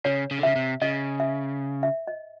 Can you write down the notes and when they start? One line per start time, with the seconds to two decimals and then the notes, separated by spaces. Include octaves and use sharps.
0.05 C#3 C#5
0.31 C#3
0.39 D3
0.43 C#3 E5
0.56 C3
0.82 C#3 D#5
1.20 E5
1.83 E5
2.07 D#5